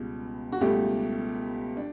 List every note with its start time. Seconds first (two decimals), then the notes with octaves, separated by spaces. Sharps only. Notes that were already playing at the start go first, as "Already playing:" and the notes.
Already playing: C#2 B2 G3
0.52 F#4
0.61 C#2 B2 G3 A3 G4
1.77 D4